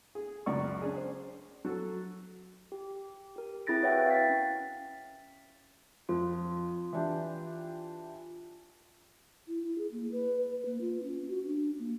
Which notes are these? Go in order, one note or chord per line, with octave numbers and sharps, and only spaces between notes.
G#4
C#2 F#2 D5 C#6
C#4 D4 G#4
C5
F#3 F#4 A4
G4
G4 A#4
C4 E4 G#4 A6 A#6 D7
F#4 B4 C#5 E5 F#5 G5
F5 G5 C#6 A6 B6
C#4
F2 F4
E3 D4 G4
E4
E4
G#4
A#3
B4
B4
A#3
F4
C#4
F#4
D4
A#3